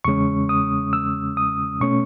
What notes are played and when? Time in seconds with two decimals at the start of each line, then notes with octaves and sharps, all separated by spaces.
0.05 E2 C#3 G#3 C#4 C#6
0.49 D#6
0.93 E6
1.37 D#6
1.80 B2 A3 C#4 C#6